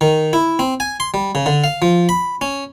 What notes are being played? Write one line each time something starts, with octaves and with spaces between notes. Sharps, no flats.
D#3
E4
C4
G#5
C6
G3
C#3
D3
F5
F3
B5
C#4